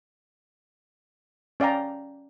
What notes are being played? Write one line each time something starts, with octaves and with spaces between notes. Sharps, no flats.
C#4 D5 F5 G5 A#5